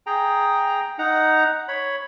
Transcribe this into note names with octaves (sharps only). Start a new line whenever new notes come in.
G#4 G5 A#5
D#4 F#5 A#5
C#5 B5